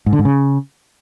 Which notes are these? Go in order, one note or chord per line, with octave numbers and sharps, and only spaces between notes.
G#2
D3
G#2
C#3